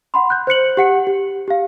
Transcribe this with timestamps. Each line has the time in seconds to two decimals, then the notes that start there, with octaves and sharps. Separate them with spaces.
0.14 F#5 B5 C6
0.30 F#6 G6
0.47 C5 F#6 C#7 F#7
0.77 G4 F#5 C#7
1.07 G4
1.48 G4 F5